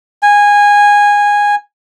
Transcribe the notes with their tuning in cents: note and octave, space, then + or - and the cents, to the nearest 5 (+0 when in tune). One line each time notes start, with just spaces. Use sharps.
G#5 -15